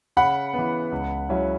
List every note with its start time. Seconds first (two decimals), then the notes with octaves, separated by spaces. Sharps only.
0.17 C#3 F#5 B5
0.53 E3 B3
0.92 C#2
1.29 C#3 F#3 C#4 E4